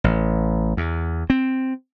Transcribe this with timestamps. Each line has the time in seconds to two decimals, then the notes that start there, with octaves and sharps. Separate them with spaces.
0.04 A1
0.77 E2
1.30 C4